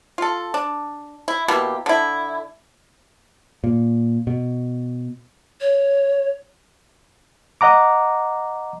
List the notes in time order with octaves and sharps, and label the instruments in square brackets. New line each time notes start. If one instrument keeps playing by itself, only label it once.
[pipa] F4 A4
D4
E4
B2 A#3 E4 G4
D3 E4
[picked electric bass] A#2
B2
[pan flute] C#5
[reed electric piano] D#5 F#5 A#5 D6